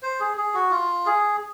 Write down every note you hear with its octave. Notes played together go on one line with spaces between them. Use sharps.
C5
G#4
G#4
F#4
F4
G#4